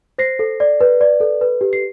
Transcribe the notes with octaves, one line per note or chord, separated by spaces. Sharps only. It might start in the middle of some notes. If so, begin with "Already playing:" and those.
C5 A#6 C7
A4
D5
B4
D5
A4
B4
G4
C7